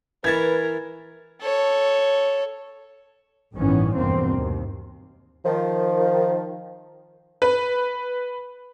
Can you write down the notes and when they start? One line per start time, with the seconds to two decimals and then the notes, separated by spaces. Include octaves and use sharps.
0.24 E3 A#4 B4 E5 C#6 G#6 A6
1.41 A4 C#5
3.54 A1 G2 D#3 E3 B3 C#4
3.95 F1 E2 G2 B2 A#3 C4
4.32 D#2
5.45 D#3 F3
7.42 B4